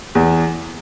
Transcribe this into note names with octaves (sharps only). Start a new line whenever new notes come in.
E2